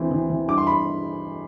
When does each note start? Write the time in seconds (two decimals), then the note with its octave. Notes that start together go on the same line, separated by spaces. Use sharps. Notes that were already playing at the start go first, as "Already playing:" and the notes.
Already playing: D2 E3 C4
0.12 E3
0.30 E3
0.48 G2 D6
0.58 C6
0.67 B5